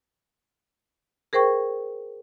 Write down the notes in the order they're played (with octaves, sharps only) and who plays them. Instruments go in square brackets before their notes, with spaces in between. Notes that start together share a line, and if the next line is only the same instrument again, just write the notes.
[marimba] G#4 A#4 C5 G5 C#6